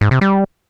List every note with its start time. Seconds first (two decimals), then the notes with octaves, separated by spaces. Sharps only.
0.01 G#2
0.11 C3
0.21 G3